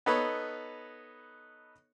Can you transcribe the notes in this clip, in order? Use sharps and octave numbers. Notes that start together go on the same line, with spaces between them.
B3 D#4 A4 B4 C#5